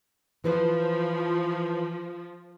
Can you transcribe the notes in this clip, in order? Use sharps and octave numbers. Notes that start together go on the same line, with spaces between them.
E3 F3 B4 C5